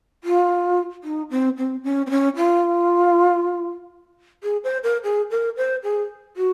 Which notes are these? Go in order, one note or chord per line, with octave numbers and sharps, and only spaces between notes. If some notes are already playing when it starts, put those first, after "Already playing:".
F4
D#4
C4
C4
C#4
C4
C#4
F4
G#4
C5
A#4
G#4
A#4
C5
G#4
F#4